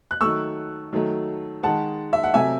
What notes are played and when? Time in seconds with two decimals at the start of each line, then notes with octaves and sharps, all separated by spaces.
0.11 F#6
0.21 D#3 F#3 A3 C#6 E6
0.93 D#3 F#3 A3
1.63 D#3 G#3 F#5 A5
2.13 E5
2.23 F#5
2.34 C3 F#3 A3 E5 G#5